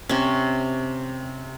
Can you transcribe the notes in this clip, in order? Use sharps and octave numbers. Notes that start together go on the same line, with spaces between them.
C3 C#4